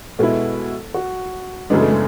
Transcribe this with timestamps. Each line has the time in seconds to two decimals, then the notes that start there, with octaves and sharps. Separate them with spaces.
0.19 B2 G#3 B3 E4 A4
0.94 F#4
1.70 F#2 C#3 E3 G#3 B3 D4
1.80 A3
1.91 G#3